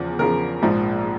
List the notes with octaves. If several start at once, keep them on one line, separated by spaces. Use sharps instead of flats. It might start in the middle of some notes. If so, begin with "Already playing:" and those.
Already playing: E2 C#3 F3
E2 C#3 F3 A#4
A#1 G#2 F3